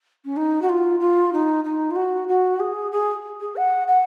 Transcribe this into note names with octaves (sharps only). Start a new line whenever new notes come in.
C#4
D#4
F#4
F4
F4
D#4
D#4
F4
F#4
F#4
G#4
G#4
G#4
F#5
F#5